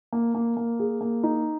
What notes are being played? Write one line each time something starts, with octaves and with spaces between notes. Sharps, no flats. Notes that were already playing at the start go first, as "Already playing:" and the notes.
A#3
A#3
A#3
G#4
A#3
D#4